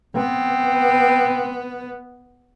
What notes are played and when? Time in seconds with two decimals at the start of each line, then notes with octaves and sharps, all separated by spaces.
0.16 B3 C4